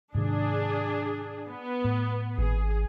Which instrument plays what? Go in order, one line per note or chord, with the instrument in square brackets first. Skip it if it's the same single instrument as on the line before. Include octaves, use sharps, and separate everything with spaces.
[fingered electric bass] G#2 C3 D#3 [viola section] D4 G#4
[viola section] B3
[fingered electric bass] A2
[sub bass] G#1 [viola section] G#4